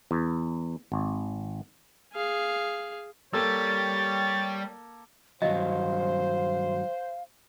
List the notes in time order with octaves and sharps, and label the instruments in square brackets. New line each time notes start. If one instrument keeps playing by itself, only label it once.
[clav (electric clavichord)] E2
G#1
[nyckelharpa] G#4 F5
[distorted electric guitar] G3 [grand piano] A#3 A4 E6 [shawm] C#5 [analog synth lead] A6
[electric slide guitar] G2 D#3 F#3 [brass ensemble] C5 [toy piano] D#5 [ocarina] F5